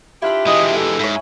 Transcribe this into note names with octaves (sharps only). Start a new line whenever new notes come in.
D4 E4 F4 G4 E5 B5
E3 G#3 D#5
A4
G#2 E4 C#5